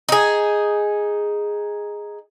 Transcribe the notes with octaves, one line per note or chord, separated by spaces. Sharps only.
D#4 G#4